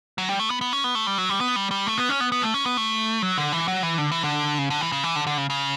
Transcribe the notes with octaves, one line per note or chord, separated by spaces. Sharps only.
F#3
G3
A3
B3
B3
C#4
B3
A3
G3
F#3
G3
B3
G3
G3
A3
B3
C#4
B3
B3
A3
C#4
B3
A3
F#3
D3
E3
F#3
E3
D3
E3
D3
C#3
D3
E3
C#3
E3
D3
D3
C#3
C#3